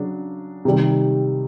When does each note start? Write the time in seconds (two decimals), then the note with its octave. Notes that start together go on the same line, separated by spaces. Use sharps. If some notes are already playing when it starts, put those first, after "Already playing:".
Already playing: C#3 F#3 D4
0.65 C3 D#3 G3